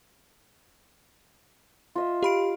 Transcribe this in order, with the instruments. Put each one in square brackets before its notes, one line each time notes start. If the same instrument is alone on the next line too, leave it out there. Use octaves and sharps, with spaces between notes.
[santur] F4 D#5 E5
[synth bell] G4 B5 D7 [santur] F5